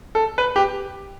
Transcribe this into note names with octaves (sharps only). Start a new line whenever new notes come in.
A4
B4
G4